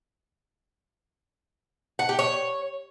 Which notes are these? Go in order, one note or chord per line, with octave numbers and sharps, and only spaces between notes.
F#5
G4
C#5